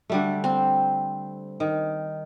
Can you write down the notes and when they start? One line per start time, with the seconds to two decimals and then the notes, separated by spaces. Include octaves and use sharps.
0.10 D3 G3 A3
0.44 C4
1.60 D#3